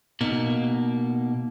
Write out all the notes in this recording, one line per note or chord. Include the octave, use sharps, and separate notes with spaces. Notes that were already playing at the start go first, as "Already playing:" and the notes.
B2 A#3 D#4